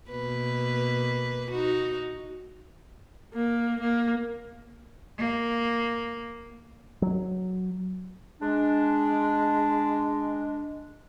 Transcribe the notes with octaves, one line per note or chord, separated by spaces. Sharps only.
B2 A#3 B4
D#4 F#4
A#3
A#3
A#3
F#3
G#3 D4